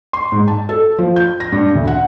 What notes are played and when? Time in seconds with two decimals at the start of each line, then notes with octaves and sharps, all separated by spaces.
0.13 C6
0.32 G#2
0.48 A5
0.69 A4
0.98 F3
1.16 G6
1.40 A#6
1.52 G2
1.75 D2
1.87 F#5